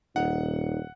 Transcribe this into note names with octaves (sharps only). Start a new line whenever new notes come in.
D#1 D#4 F#5